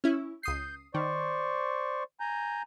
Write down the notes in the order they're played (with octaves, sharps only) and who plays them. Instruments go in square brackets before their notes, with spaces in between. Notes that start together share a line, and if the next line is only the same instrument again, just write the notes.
[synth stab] C#4 E4
[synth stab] C#2 D#6 C7 [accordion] G6
[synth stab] D#3 [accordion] C5 D5 C#6
[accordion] G#5 A#5 G6